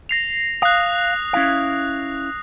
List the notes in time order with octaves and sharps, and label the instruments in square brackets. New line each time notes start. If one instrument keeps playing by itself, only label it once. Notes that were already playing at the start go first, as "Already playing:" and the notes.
[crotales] A#6 C7 F7
[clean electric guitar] F5 [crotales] D#6 F#6
[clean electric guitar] C#4 E4 F5